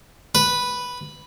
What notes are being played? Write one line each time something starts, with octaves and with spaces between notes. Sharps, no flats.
B4